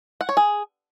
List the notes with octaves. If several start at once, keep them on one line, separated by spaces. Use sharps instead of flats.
F#5
C#5
G#4